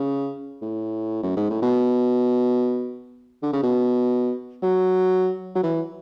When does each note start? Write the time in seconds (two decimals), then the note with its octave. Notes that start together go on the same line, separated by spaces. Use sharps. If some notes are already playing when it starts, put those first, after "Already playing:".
Already playing: C#3
0.62 A2
1.23 F#2
1.37 G#2
1.50 A2
1.62 B2
3.43 D3
3.53 C#3
3.63 B2
4.62 F#3
5.55 F#3
5.63 E3